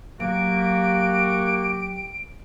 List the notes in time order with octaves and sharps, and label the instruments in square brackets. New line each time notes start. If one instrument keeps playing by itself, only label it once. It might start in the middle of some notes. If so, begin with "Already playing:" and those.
[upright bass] F#3 [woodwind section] A#3 F#4 [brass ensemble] G4 [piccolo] D7